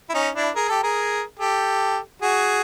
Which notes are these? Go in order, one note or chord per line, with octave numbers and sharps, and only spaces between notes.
E4
C#4 D#4
D4 E4
G#4 A#4
G4 A4
G#4 A#4
G4 A4
F#4 G#4